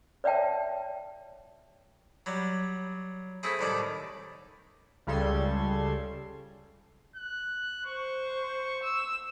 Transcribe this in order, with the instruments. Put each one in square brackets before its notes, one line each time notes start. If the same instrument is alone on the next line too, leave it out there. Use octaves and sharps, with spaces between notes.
[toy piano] C#5 D5 E5 G5 A5
[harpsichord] F#3 G3
A3 C4 E4 G#4
C2 A2 D#3 D5 A5
[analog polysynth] C#2 C#3 G3 A4 C6 G#6
[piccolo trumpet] F#6
[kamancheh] C5 [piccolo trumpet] C#6
[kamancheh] E6